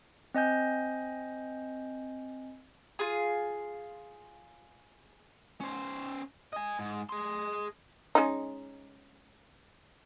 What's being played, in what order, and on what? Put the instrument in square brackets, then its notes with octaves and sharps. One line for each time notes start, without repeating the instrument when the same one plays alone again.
[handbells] C4 D#5 G#5 G6
[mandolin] F4 G#4
[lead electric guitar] C#4 C5
D#5 G#5
G#2
G#4 C6
[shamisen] G#3 C#4 D#4